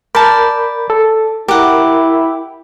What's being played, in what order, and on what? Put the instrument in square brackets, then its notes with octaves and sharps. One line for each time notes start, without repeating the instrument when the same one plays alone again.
[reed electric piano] A#4 B5 G6 [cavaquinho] D5 A5
[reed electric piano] A4
[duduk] E4 [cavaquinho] G4 F#5 [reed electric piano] A#4